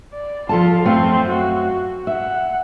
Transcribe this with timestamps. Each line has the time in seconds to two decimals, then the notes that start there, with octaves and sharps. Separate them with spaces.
0.13 D5
0.49 F3 F4 A4 A5
0.85 F#2 A3 C4 F5
1.28 F#4
2.07 E5 F#5